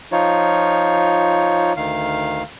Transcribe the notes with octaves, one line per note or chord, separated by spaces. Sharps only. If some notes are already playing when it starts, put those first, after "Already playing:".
F3 D#4 F4 C#5
D2 D#3 F5